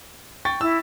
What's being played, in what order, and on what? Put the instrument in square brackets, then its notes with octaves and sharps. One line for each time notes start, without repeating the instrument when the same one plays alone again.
[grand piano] G5 C#6 A6
[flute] E4 [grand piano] E6